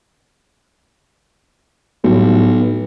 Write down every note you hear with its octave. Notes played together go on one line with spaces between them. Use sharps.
B1 A2 F#3 G3
B3